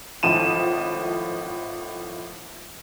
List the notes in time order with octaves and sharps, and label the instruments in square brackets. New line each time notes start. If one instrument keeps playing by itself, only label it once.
[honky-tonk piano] G#1 A2 F3 D#7 E7